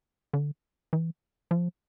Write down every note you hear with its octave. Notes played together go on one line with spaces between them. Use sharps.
D3
E3
F3